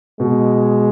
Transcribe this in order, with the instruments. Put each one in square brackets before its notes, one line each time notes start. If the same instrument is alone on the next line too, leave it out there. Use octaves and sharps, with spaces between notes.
[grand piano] B2 [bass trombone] G#3